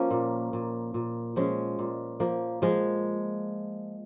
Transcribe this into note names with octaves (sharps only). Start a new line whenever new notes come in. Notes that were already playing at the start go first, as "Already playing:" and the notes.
Already playing: F3 A#3 C#4
A#2
A#2
A#2
F3 G#3 C#4
A#2
F3 A#3
F3 G#3